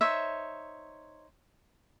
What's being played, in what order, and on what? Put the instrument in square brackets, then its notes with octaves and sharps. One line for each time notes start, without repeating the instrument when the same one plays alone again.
[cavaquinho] D#4 C5 C#5 E5